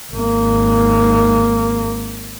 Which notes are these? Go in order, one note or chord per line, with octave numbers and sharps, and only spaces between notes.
G#1 A#3